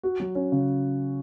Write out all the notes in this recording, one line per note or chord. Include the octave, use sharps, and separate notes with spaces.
F#4
F#3
C#4
C#3